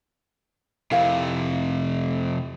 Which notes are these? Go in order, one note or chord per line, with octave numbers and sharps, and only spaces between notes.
F2 C3 E4 A#4 F5